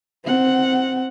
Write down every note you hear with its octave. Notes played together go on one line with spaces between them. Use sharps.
C4 F#5